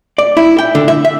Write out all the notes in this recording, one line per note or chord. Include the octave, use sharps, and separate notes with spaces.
D5
E4
G5
D3
E5
E5